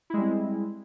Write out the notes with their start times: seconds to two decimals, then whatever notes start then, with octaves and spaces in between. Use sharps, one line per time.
0.10 E4
0.14 G#3
0.17 G3
0.21 C4